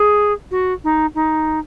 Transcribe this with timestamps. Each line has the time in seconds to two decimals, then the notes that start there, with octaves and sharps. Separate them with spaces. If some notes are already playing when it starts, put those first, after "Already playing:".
Already playing: G#4
0.51 F#4
0.84 D#4
1.15 D#4